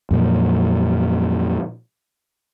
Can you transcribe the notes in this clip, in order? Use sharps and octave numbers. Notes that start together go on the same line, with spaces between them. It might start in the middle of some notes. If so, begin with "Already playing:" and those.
F2 A#2 F#3